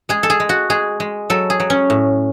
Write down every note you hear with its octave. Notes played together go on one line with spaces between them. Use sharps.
G#3 G#4
A4
G#4
G#3
F#4
G#3 G#4
G#3
F#3 A4
G#4
F#3
C#4
A2